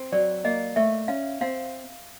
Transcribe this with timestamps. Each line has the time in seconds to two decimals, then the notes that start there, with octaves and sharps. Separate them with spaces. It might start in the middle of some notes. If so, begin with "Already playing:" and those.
Already playing: C4
0.12 F#3 D5
0.45 A#3 D#5
0.76 A3 E5
1.08 C#4 F5
1.41 C4 F5